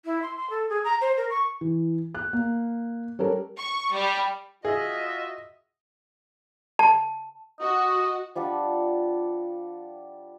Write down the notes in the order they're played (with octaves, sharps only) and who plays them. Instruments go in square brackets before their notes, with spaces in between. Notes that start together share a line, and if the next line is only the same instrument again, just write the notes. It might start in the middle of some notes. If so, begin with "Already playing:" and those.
[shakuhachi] E4
C6
C6
A4
G#4
A#5
C5
A#4
C#6
[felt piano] E3
F#6
A#3
G3 C#4 A4 A#4
[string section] C#6
G3
[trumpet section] F4 F#4 E5 [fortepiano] G#4 [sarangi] D#5
[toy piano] A5
[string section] F#4 [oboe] D#5
[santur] F3 G3 D4 F#5